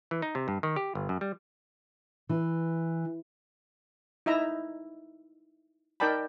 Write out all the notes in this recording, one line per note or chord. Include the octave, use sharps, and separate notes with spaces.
E3
D#4
C3
G2
D#3
G4
G1
F#2
G3
E3
D#4 E4 E5 A#5
D#4 A#4 D5 G5 A5 B5